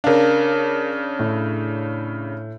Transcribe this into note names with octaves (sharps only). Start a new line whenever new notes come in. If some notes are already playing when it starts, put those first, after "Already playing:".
C#3 D4 A#4 F5
A2